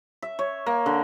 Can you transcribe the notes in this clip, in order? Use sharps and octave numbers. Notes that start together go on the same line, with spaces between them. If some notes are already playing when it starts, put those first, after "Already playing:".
E5
C#5
A#3
D3